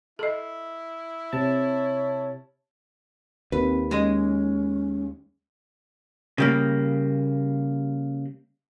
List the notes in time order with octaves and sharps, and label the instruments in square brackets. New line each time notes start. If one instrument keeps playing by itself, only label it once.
[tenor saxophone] E4 [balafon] A4 D#5
[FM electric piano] C3 A5 [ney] C#5
[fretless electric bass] D#2 [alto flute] C4 [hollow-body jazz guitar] B4
[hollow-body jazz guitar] G#3 D#5 [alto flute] C#4
[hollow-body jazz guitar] C#3 G3 A#3